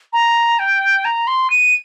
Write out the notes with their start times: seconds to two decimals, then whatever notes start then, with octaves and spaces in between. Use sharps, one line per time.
0.13 A#5
0.59 G5
1.05 A#5
1.27 C6
1.50 D#7